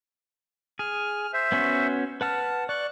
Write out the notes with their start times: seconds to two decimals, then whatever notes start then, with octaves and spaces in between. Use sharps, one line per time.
0.79 G#4 F6
1.33 C5 E5
1.52 B3 C#4 F#4
2.21 B4 F#5 A5 F6
2.69 D5 C#6 F#6